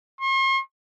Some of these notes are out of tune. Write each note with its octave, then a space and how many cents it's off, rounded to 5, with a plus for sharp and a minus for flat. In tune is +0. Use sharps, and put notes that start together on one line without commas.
C6 +45